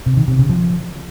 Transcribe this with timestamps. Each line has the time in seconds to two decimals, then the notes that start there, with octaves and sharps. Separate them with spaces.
0.06 C3
0.17 D#3
0.28 C3
0.39 C#3
0.49 F3